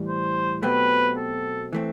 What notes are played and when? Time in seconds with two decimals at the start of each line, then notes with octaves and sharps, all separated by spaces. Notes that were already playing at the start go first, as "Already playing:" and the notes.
Already playing: A2 E3 G3
0.08 C5
0.63 B2 F#3 A3 C4 G4 B4
1.18 A4
1.73 E3 A3 C4